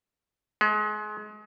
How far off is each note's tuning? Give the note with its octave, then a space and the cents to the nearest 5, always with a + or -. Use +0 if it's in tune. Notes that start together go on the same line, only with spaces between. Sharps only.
G#3 +30